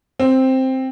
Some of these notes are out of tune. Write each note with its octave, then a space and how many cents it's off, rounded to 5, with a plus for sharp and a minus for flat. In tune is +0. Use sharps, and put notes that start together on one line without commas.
C4 +5